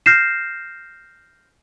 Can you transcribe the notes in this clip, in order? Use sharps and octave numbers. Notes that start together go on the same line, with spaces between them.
F6 G6 A#6 C7 E7